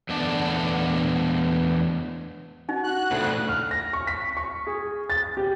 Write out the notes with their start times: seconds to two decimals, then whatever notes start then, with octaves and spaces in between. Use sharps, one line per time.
0.09 E2 A3 B3 D4 D5 A5
2.69 D#4 F#4
2.84 F#4 F#6
3.11 D2 A2 C#3
3.48 F6
3.71 A#6
3.93 C#6
4.07 B6
4.37 C#6
4.67 G#4
5.10 A6
5.37 G4